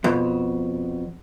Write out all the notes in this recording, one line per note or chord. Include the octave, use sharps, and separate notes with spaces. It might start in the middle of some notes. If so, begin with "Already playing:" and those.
F2 B2